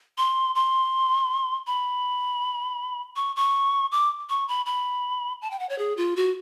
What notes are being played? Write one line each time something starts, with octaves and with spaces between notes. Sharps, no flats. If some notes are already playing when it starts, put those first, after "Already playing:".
C6
C6
B5
C#6
C#6
D6
C#6
B5
B5
A5
G5
F#5
C#5
G#4
F4
F#4